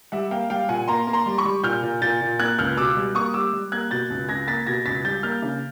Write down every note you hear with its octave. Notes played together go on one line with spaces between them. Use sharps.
G3 E5 F#5
A#3 F5 G5
G3 F5 G5
A#2 F#5 G#5
A#3 A#5 C6
A#3
A#5 C6
G3
B5 C#6
G3
A#2 F6 G6
A#2
A#2 G6 A6
A#2
A#3 F#6 G#6
C#2 F6 G6
B2 D6 E6
G3
A#3 C#6 D#6
G3 D6 E6
G3
A#3 F#6 G#6
B2 G6 A6
C#2
C#2 G#6 A#6
A#3 A6 B6
B2 G#6 A#6
C#2 A6 B6
G3 G6 A6
A#3 F6 G6
C#3